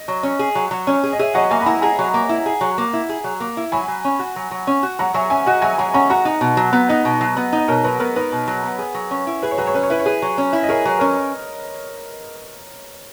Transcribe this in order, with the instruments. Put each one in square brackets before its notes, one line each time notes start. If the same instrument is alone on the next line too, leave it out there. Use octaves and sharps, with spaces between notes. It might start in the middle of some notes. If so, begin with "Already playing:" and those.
Already playing: [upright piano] D#5
[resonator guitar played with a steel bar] F#3
C#4
G#4
F#3
F#3
C#4
G#4
[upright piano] D#5
[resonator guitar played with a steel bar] G#4 [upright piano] C#5 E5
[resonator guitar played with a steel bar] F#3 [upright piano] D#5 F#5
[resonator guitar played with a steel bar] A#3 [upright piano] E5 G#5
[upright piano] B5
[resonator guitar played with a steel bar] E4 [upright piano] F#5 A#5
[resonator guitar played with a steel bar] G#4 [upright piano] F#5 A#5
[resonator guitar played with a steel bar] F#3
A#3
E4
G#4
F#3
A#3
E4
G#4
F#3
A#3
E4
[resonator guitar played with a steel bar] F#3 [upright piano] G#5 B5
[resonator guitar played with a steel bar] F#3
C#4
F#4
F#3
F#3
C#4
F#4
[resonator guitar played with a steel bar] F#3 [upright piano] F#5 A#5
[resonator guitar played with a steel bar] F#3 [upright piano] E5 G#5
[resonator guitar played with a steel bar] C#4 [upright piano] E5 G#5
[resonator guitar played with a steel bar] F#4 [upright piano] D#5 F#5
[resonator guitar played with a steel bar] F#3 [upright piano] E5 G#5
[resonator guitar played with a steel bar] F#3 [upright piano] F#5 A#5
[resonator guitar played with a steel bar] C#4 [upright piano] F#5 A#5
[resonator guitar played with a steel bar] F#4 [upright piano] F#5 A#5
[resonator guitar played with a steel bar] D#4
B2
F#3
B3
[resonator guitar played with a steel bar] D#4 [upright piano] D#5 F#5
[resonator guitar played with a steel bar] B2
F#3
B3
D#4
[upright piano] D#5
[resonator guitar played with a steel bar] B2 [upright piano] A#4 C#5
[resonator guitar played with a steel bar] F#3 [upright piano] B4
[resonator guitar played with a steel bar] B3 [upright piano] A#4
[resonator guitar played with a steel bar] D#4 [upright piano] B4
[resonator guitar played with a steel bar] B2
F#3
B3
G#4
F#3
C#4
E4
[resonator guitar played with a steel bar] G#4 [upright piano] B4
[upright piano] C#5
[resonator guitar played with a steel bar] F#3 [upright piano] B4
[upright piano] C#5
[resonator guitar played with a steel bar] C#4 [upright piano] B4
[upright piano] C#5
[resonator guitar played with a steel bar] E4 [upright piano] B4
[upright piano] C#5
[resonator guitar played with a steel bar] G#4 [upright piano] B4
[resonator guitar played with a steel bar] F#3
C#4
E4
[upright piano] D#5
[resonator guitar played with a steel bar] G#4 [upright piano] A#4 C#5
[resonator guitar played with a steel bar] F#3
[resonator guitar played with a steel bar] C#4 [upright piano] A#4